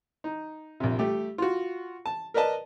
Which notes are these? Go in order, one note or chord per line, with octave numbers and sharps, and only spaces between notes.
D#4
A#1 C3
G3 A3 G4
F4 F#4
A5
A#4 B4 D5 D#5 A5